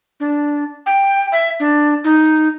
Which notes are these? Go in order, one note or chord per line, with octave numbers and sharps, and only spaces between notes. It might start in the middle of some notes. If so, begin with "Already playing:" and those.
D4
G5
E5
D4
D#4